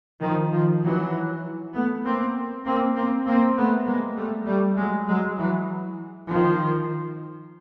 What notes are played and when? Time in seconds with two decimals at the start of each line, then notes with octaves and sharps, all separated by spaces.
0.22 D#3 F3
0.52 D#3 F3
0.83 E3 F#3
1.74 A3 B3
2.04 A#3 C4
2.65 A#3 C4
2.95 A#3 C4
3.25 A#3 C4
3.57 A3 B3
3.86 G#3 A#3
4.16 G3 A3
4.47 G3 A3
4.77 F#3 G#3
5.07 F#3 G#3
5.38 E3 F#3
6.29 D#3 F3